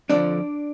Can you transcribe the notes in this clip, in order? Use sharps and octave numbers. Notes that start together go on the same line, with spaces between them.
F2 D3 F3 D4 D5